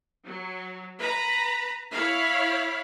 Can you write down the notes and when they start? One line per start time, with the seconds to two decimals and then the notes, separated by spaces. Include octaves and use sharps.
0.24 F#3
0.99 B4 A#5 B5
1.91 E4 C#5 F5 B5